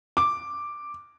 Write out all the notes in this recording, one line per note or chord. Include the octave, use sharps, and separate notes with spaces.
D6